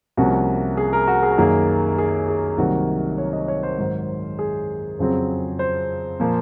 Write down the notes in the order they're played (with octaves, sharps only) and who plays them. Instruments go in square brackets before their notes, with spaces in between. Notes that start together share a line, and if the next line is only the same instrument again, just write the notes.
[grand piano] C2 C3 F3 A#3 C#4 F#4
G#4
A#4
F#4
G#4
F#4
F#2 D#3 A#3 G#4
G#4
G#4
C2 C3 D#3 F#3 A#3 F#4
C#5
D#5
C#5
C5
G#2 D#3 F#3
G#4
F2 C#3 F#3 C4
C5
A#2 F3 A#3